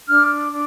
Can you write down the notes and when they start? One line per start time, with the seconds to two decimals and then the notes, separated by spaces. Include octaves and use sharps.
0.07 D4 F6
0.51 D4